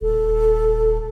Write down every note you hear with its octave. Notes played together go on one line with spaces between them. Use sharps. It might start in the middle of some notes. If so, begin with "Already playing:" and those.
D#1 A4